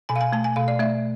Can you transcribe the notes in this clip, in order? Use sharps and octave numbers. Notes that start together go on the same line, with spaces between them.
B2 G#5
F5
G#5
A3 A5
G#5
B2 F5
D5
A3 E5